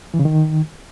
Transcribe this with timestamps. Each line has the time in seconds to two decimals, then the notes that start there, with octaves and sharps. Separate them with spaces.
0.14 E3
0.19 C#3
0.25 D#3